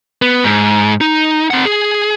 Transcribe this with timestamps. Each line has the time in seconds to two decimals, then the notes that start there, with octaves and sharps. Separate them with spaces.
0.22 B3
0.44 G#2
1.01 D#4
1.51 C4 F#5
1.65 G#4